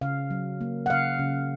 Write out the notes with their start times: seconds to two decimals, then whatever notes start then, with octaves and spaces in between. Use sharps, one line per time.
0.01 C#3 F5
0.30 F#3
0.61 A#3
0.86 F#5
0.90 C#3 F5
1.19 C#3